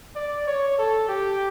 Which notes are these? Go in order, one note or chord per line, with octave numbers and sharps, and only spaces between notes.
D5
C#5
A4
G4